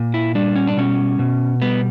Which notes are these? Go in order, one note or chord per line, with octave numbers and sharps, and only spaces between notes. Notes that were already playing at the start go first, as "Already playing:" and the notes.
Already playing: A#2
E4
G3 D4
C#4
D4
B2 C#4
B2
G3 B3